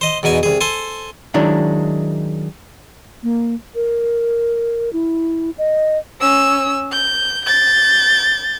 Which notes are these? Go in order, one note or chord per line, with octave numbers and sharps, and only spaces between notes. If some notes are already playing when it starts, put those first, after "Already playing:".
C5 D#5
E2 B2 D#4 G#5
C2 G#4
A4 C5 G#5
D#3 F#3 G#3 D4 E4
A#3
A#4
E4
D#5
C#4 E6
G6
G6 A6